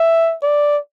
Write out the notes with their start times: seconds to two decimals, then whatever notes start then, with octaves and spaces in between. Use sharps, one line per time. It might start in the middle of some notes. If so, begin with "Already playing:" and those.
Already playing: E5
0.43 D5